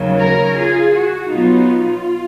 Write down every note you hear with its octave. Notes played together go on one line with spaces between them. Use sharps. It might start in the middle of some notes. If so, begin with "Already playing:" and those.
Already playing: D#2 C#3 F#3
A#4 C#5
F4 G#4
F#4
B2 F#3 B3 D#4 F4
F4